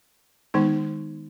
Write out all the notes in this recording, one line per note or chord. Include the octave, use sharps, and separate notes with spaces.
D#3 G#3 B3 D#4